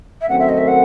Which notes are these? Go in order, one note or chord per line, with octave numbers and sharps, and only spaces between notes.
E5
F#2 D#3 A3 C4 F#5
E5
D#5
E5
F#5